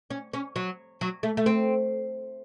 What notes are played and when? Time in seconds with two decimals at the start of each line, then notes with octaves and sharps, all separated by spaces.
0.10 C#4
0.34 C#4
0.56 F#3
1.01 F#3
1.23 A3
1.37 A3
1.46 C4